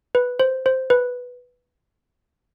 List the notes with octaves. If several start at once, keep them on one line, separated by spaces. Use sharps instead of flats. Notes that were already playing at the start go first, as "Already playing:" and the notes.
B4
C5
C5
B4